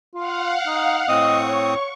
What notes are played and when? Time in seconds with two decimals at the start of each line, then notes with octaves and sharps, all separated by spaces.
0.15 F4 F5 F#5
0.67 D#4
1.09 A2 C4 D#5 C#6 D#6
1.49 C#5